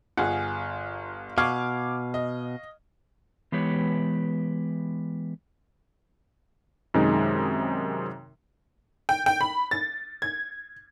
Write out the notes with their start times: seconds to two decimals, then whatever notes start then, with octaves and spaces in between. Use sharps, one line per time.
0.17 G1 F4 G#4 F#5
1.38 B2 F5 C#6 D6 F6 G#6
2.14 D#5
3.52 E3 G#3 B3 G4 B4 C#5
6.94 F#2 C3 D#3 G#3 D#4
9.09 G5
9.26 G5
9.41 B5
9.71 A6
10.22 G#6